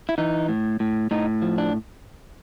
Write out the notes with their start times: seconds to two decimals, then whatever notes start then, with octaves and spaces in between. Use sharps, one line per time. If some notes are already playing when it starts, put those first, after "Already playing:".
0.09 E4
0.18 E3 D#4
0.49 A2
0.80 A2
1.11 A2 D#4
1.42 F3
1.58 D4